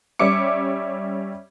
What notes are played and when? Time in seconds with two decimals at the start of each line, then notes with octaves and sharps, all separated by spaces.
0.19 G3 C#4 E5 D6 C#7